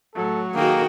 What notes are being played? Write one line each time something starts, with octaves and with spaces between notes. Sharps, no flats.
A2 F#3 A4
D#3 A#3 F#4 G#4 A4 G5